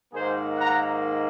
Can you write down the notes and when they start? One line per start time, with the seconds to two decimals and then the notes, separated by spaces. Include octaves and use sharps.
0.12 G#2 D#3 A#3 G#4 C5
0.57 F#5 A#5